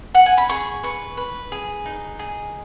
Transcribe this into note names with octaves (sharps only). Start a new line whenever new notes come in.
F#5
G#5
B5
G#4 C#6
B4 C#6
B4
G#4
D#4
G#4